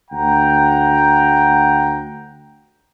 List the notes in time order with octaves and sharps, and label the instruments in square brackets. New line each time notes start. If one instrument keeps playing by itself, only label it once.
[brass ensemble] D2 F#5 G5 A#5